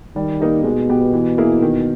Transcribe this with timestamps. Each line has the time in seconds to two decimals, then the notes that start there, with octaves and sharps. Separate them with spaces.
0.16 D#3 G3
0.40 A#3 D#4 G4
0.64 B2 G#3
0.90 B3 G4
1.13 E3
1.38 A#3 E4 G#4
1.62 D#3